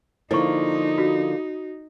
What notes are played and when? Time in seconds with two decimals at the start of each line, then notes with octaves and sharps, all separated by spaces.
0.31 D3 F3 A#3 D#4 E4 C#6
0.98 F#4